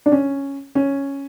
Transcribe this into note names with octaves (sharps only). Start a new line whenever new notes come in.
D4
C#4
C#4